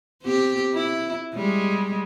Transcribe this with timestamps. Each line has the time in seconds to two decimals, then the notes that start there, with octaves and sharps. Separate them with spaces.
0.22 C4 G4
0.74 E4
1.34 G3 G#3